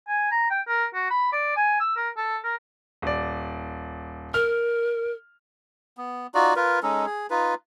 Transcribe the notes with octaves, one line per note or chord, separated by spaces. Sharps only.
G#5
A#5
G5
A#4
F#4
B5
D5
G#5
E6
A#4
A4
A#4
D#1 D5
A#4 F6
B3
D#4 F4 F#4 D5
F4 A#4 B4
G#3 C#4 D#4 A4
G#4
D#4 F4 B4